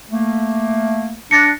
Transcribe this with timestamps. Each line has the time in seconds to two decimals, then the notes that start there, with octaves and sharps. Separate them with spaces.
0.10 A3 A#3
1.31 D4 A6 A#6 C#7